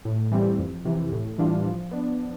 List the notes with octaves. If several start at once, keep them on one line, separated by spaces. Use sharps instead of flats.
A2
E3 G3 C4
F2
C3 E3
A2
E3 G3 D4 F4
F3
B3 D4